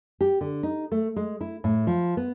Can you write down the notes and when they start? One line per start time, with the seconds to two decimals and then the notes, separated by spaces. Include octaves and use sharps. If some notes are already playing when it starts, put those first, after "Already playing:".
0.21 G4
0.41 D3
0.63 D#4
0.92 A3
1.16 G#3
1.41 E4
1.64 A2
1.87 F3
2.17 B3